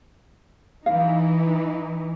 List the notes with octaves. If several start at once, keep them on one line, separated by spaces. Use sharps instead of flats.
E3 D#4 F5